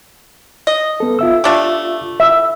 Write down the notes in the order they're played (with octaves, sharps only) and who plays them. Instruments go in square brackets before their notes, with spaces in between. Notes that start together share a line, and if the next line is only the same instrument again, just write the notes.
[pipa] D#5
[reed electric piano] B3 A4
F4 E5 E6
[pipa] A3 D4 G4
[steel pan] E5